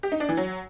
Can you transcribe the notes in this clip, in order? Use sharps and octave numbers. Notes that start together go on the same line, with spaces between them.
G4
D#4
D4
E3
F#3